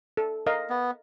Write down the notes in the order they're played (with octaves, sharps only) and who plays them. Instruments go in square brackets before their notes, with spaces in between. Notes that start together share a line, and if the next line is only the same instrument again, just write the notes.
[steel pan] A4
A#4 D#5 F5
[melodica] B3